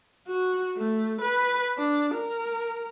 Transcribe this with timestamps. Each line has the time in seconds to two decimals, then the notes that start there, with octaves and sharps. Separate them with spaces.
0.28 F#4
0.77 A3
1.21 B4
1.78 D4
2.14 A#4